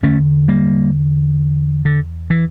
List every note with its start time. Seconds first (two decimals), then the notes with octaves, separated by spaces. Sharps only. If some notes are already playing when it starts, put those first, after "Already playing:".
0.03 E2 D3 A3 C#4
0.48 G3 A#3
1.85 D3
2.30 E3